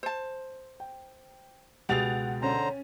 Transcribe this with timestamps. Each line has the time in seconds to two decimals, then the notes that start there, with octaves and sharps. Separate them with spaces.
0.03 C5 A5
0.80 G5
1.89 C#2 B2 G4 G#4 F#5 A6 F7
2.42 D3 C#4 C5 A#5